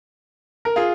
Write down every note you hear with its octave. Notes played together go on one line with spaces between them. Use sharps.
A#4
F4 G#4